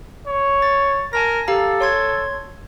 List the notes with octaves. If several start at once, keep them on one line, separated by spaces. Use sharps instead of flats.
C#5
A6
A#4 G#5 A5 A#6
G4 A4 F5 A#5
C#5 C6 G#6